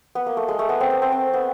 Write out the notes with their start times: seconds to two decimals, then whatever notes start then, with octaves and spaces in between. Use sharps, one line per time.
0.15 B3
0.27 A#3
0.37 A3
0.48 G#3
0.59 A3
0.69 B3
0.81 C4
0.91 B3
1.02 C4
1.12 C4
1.33 B3